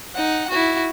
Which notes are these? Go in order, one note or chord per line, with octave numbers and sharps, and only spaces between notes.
D#4 F#5
E4 F#4